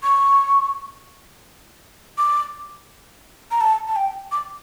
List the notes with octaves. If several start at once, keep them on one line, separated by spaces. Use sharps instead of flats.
C#6
D6
A#5
A5
A5
G5
D6